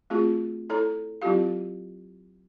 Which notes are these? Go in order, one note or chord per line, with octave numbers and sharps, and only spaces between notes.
A3 C4 F4 F#4 G#4
E4 A4 C#5 A#5
F#3 C4 E4 F4 G4 F5